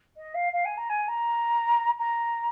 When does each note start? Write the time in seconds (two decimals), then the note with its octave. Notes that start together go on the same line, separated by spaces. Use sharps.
0.16 D#5
0.34 F5
0.52 F5
0.65 G#5
0.77 A#5
0.89 G#5
1.08 A#5
1.98 A#5